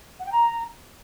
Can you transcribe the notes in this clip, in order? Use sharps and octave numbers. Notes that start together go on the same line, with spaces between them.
F#5
G5
A#5